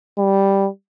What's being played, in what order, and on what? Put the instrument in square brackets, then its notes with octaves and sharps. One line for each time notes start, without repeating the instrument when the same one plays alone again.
[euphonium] G3